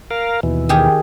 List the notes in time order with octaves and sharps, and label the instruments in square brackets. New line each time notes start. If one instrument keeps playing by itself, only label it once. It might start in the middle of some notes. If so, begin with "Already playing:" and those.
[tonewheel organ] A#4 F5
D#2 B2 E3
[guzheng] D#3 G4 G#4